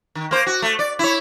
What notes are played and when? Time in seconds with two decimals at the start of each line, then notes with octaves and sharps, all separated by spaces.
0.15 D#3
0.31 A#3 C5
0.47 F#4
0.62 A3
0.79 D5
0.99 E4 C#5